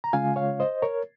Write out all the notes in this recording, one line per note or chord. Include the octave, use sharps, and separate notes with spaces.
A#5
C#3 G#3 C#4 F4 F5 G#5
C#5 F5
C5 D#5
A#4 C#5